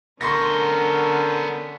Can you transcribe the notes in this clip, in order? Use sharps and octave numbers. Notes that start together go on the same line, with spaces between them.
D3 B3 C#4 A#4 C5 C6 C#6 A#6